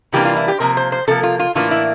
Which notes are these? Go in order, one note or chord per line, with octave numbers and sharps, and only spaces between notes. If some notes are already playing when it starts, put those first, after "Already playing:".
C3 E3 G3 A#3 D4 G4
F4
E4
G4
C3 F3 A#3 A#4
C5
C5
C3 F3 A#3 A4
F4
F4
A2 E3 A#3 D4 F4
E4